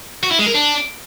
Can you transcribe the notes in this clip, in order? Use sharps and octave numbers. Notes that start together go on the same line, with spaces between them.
F#4
E4
G#3
A#4
D4